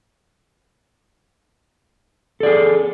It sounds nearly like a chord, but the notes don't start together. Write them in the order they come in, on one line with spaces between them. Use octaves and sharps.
A4 D5 G#4